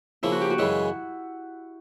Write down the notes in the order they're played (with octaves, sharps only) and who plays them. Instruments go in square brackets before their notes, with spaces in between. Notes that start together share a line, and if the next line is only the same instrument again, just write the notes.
[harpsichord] C#3 F3 A#3 [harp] E4
[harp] F#4
G4
F#4
[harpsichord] F#2 C#3 E3 G#3 [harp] E4